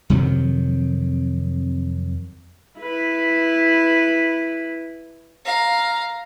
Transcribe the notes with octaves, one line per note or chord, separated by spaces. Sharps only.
F2 C3 D#3 F#3
E4 B4
F5 A#5